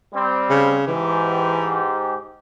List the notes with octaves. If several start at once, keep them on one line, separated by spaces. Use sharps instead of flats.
G3 C4
C#3
G#2 E3 G4